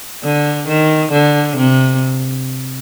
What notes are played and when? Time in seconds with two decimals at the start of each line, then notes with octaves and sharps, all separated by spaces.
0.24 D3
0.68 D#3
1.12 D3
1.57 C3